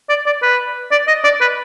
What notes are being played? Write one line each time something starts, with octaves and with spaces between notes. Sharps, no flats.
D5
D5
B4
D5
D#5
D5
B4